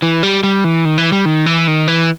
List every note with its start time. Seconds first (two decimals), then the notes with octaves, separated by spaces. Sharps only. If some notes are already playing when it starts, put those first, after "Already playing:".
0.02 E3
0.23 G3
0.43 G3
0.64 E3
0.85 D#3
0.98 E3
1.12 G3
1.25 D#3
1.46 E3
1.67 D#3
1.88 E3